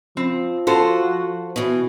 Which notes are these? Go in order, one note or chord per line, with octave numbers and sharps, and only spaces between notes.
F3 C4
F4 F#4 A4 C5
B2 E3